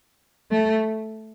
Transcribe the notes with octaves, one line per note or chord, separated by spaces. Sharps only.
A3